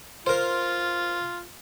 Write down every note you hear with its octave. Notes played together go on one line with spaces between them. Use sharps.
F4 A#4 C5